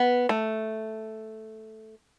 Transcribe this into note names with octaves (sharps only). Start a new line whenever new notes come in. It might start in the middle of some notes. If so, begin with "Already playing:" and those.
Already playing: B3
A3